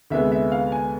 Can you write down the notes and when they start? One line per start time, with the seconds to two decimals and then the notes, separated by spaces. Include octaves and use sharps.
0.10 D2 C3 G#3 B3 E5
0.32 E5
0.52 F5
0.72 G#5